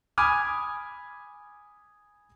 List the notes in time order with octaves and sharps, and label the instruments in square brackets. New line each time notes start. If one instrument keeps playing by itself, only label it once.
[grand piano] G#5 B5 D6 D#6 F6 G#6